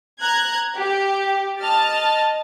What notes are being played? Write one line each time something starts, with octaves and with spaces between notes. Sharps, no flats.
A#5 F#6 G#6
G4
D#5 A5 F6 A6